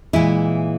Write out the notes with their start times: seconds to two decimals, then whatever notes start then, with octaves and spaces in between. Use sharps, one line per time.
0.13 A#2 E3 G#3 E4